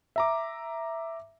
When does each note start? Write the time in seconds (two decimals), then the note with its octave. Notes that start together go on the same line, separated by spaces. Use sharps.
0.16 E5 A#5 D6